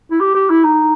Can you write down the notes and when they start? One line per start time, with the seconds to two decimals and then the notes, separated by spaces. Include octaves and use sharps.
0.11 E4
0.20 G4
0.34 G4
0.50 E4
0.64 D#4